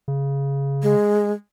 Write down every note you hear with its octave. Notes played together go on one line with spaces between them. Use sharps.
C#3
G#3